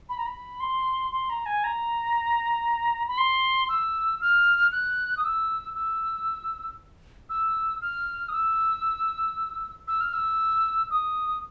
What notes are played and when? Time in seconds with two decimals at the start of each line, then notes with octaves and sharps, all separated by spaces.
0.09 B5
0.18 A#5
0.26 B5
0.60 C6
1.12 C6
1.30 A#5
1.46 G#5
1.64 A#5
3.08 B5
3.18 C6
3.69 E6
4.21 F6
4.72 F#6
5.17 D#6
5.23 E6
5.75 E6
7.30 E6
7.82 F6
8.29 D#6
8.32 E6
9.88 E6
10.01 F6
10.14 E6
10.91 D#6